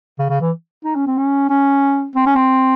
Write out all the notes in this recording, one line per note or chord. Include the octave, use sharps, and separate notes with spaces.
C#3
C#3
E3
D#4
C#4
C4
C#4
C#4
C4
C#4
C4